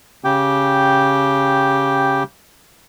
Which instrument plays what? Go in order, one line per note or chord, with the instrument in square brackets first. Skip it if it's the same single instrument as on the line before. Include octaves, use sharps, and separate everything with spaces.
[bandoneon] C#3 G4 G5